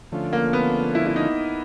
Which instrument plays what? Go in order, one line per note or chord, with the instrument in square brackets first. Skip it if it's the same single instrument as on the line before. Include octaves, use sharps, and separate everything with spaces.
[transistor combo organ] D3 F3 A3 C#4 F4
[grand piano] A#3
B3
E4
E4
D#4